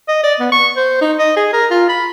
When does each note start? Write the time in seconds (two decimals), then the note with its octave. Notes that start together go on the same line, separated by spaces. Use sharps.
0.08 D#5
0.23 D5
0.40 B3
0.52 C#6
0.77 C5
1.01 D#4
1.18 D#5
1.36 G#4
1.53 A#4
1.70 F4
1.89 B5